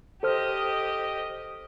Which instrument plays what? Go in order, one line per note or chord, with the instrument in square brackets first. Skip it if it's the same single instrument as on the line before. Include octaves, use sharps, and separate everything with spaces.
[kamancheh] G4 D#5 [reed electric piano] A4 C5 F6